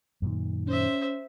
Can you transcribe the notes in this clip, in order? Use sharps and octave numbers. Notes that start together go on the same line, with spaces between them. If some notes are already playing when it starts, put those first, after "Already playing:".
F#2 A#2 D#3
C#4 C5 E5